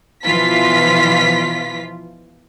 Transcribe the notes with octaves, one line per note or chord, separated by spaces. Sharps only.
B2 E3 F3 F4 B6